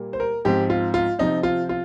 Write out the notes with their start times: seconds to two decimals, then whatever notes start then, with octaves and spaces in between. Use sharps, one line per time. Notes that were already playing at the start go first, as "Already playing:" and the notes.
Already playing: A#2 G3 A#3
0.13 C5
0.20 A#4
0.45 G#2 F3 C4 G4
0.70 F4
0.94 F4
1.19 C3 F3 C4 D#4
1.43 F4
1.69 F4